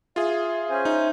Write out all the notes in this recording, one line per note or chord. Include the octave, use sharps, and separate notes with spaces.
F4 G#4 E5
C#4 C5 G#5
D#4